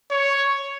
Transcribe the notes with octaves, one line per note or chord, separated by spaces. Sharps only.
C#5